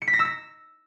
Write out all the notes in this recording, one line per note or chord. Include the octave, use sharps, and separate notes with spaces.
C#7
B6
A#6
E6
A#6